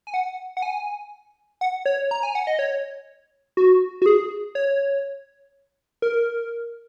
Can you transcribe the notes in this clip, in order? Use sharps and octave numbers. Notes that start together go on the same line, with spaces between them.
G#5
F#5
F#5
G#5
F#5
C#5
A#5
G#5
F#5
D#5
C#5
F#4
F#4
G#4
C#5
A#4